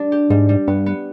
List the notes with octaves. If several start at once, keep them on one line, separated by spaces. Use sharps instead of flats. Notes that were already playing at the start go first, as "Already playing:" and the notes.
Already playing: G3 D4
G4
G#2 G3
G3
G2 B3
B3